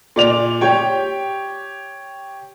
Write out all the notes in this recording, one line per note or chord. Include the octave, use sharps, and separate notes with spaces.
A#2 D5 F7
G4 C#5 G5